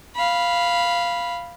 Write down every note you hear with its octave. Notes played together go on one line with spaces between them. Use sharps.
F5 B5